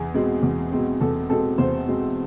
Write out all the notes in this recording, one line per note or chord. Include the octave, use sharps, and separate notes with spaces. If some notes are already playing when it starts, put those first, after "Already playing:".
Already playing: E2 G#4
B2 G#3 C4
E2
B2 G#3 C4
E2 A4
B2 G#3 C4 A4
E2 C5
B2 G#3 C4